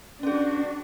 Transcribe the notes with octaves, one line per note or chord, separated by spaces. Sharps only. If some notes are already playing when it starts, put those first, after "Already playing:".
C#4 D4 F#4 G#4